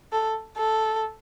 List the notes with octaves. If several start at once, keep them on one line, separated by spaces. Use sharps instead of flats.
A4
A4